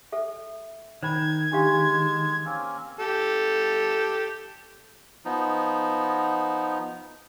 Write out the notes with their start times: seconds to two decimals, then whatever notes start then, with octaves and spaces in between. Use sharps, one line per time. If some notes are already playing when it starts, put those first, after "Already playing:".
0.12 A4 E5
1.03 D#3 C5 B5 G#6
1.52 G#3 D4 G4 F5
2.45 A#3 C4 C#4
3.00 G4 A4
5.25 F3 B3 D#4